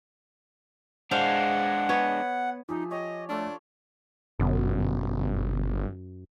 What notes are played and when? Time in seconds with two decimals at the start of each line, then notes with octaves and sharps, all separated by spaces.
1.11 G#3 D4 C5 F5 F#5
1.89 B3 C#5
2.69 F3 D#4 G4 G#4 E5
2.91 G4 C#5 D#5
3.29 A3 D4 F4 A4 C#5
4.40 G1 F#2 B2 D3 B3